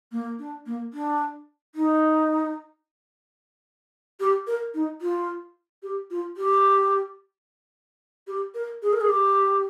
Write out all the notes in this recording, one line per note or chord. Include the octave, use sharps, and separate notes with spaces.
A#3
D4
A#3
D4
D#4
G4
A#4
D#4
F4
G4
F4
G4
G4
A#4
G#4
A#4
G#4
G4